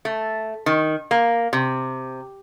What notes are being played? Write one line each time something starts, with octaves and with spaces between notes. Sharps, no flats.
A3
D#3
A#3
C3